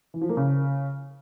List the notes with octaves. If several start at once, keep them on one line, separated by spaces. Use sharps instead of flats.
E3
F3
A#3
C#3